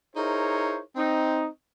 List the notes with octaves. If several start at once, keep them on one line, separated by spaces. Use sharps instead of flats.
D#4 E4 G#4 A#4 C5 C#5
C4 D#4